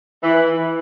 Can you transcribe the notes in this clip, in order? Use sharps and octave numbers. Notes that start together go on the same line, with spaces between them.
E3